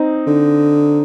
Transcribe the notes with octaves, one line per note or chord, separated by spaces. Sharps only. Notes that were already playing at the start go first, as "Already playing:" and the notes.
Already playing: C4 D#4
D3